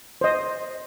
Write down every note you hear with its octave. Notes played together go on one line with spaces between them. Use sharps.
C5 D#5